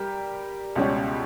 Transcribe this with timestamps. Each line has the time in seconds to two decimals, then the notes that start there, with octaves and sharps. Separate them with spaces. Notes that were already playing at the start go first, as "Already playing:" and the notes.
Already playing: G3 G4 A#4
0.76 C#2 B2 G3 C#4 G4